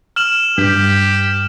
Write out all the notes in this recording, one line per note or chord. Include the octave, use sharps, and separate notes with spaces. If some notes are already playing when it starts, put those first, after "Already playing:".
F6 E7 F#7
G2 G4